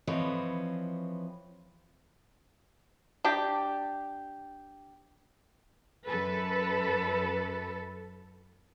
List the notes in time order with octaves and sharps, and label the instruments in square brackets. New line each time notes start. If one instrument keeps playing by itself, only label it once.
[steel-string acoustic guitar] E3 F3 C4 B4 C#5 D#5
[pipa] D4 G4
[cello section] F#2 A4 B4